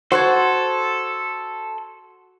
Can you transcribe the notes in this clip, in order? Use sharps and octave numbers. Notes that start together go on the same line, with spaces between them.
F#4 A4 C5 C6 F#6 G#6